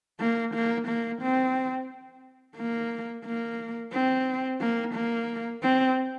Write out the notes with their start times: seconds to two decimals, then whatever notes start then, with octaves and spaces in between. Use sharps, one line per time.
0.20 A#3
0.54 A#3
0.87 A#3
1.22 C4
2.57 A#3
3.26 A#3
3.92 C4
4.61 A#3
4.94 A#3
5.63 C4